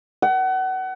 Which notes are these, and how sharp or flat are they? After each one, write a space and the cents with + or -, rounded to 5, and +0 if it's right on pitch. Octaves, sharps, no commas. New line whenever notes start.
F#5 +30